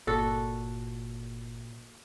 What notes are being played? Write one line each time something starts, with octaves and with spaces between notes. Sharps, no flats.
G1 A#2 F#4 A4